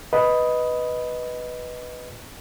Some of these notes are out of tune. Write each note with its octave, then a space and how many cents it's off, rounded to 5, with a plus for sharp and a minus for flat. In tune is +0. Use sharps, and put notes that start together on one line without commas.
B4 +0 D#5 +5